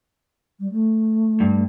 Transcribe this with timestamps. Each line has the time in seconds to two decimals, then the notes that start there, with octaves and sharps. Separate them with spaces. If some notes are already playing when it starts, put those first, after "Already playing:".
0.60 G3
0.72 A3
1.40 G2